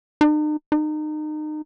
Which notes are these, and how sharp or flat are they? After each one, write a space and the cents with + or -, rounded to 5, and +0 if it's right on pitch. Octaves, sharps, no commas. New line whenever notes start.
D#4 -45
D#4 -30